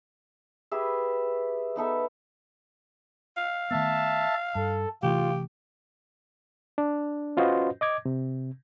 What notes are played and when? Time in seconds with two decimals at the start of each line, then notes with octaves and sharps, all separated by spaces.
0.72 G4 G#4 B4 E5
1.76 B3 D#4 A4 E5
3.37 F5
3.71 D#3 A3 B3 E5 A5
4.55 G2 A4
5.03 C3 E3 A3 F4 G4
6.78 D4
7.37 C#4 F4 F#4 B4 C5 D#5
7.81 D#5 D6 G#6
8.05 C3